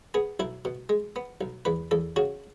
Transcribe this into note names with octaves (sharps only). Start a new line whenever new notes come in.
B3 G#4
B1 E4
B2
G#3
B3
B1
E2 B4
E2 A4
C#3 F#4